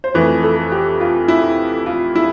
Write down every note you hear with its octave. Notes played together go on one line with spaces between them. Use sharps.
C5
F2 E3 A3 B4
A4
G4
F4
E4
F4
E4